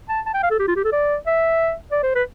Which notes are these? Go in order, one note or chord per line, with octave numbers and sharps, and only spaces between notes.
A5
A5
G5
F5
A4
G4
F4
G4
A4
D5
E5
D5
C5
B4